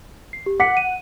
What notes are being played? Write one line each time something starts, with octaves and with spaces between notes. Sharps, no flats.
C7
G4
F#5 D6 B6 C#7
D#7